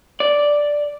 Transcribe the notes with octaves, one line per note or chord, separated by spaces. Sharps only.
D5